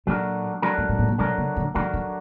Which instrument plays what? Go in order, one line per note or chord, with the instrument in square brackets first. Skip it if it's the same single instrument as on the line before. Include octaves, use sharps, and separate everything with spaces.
[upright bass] A#2 [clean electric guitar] F#3 A3 D4 F#4 A#4
[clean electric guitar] F#3 A3 D4 F#4 A#4
[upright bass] G2
G#2
A2
A#2
[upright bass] B2 [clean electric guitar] F#3 A3 D4 F#4 A#4
[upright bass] C#3
D3
[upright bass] D#3 [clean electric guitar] F#3 A3 D4 F#4 A#4
[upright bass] D#3